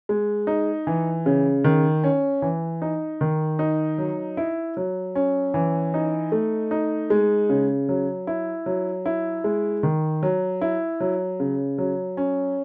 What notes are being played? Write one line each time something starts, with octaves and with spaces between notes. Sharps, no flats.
G#3
D#4
E3
C#3
D#3
C#4
E3
D#4
D#3
D#4
F#3
E4
F#3
C#4
E3
D#4
A3
D#4
G#3
C#3
F#3
E4
F#3
E4
G#3
D#3
F#3
E4
F#3
C#3
F#3
C#4